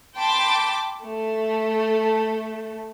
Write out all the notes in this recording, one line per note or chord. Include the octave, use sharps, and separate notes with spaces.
G5 A5 B5 C6 D6
A3